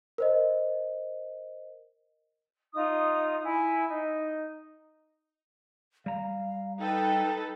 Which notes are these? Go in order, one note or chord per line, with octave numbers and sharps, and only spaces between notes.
A#4 C5 D#5
D#4 F4 D#6
E4 E5 G#5
D#4
G3 F5 A#5
D#4 A4 B4 G5